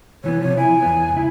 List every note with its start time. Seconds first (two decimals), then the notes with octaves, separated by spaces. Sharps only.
0.24 C2 E3 B3 C#5
0.41 C3 F3 C#5
0.57 E4 G#5
0.82 E2 B3
1.13 C#2 E4